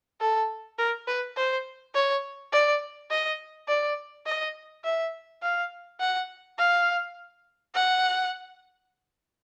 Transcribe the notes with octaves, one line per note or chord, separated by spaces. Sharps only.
A4
A#4
B4
C5
C#5
D5
D#5
D5
D#5
E5
F5
F#5
F5
F#5